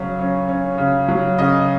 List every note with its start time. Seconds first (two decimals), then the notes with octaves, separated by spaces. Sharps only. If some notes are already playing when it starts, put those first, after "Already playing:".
Already playing: C#3 F#3
0.19 C#4
0.48 C#4
0.78 C#3
1.08 F#3
1.38 C#3 D#5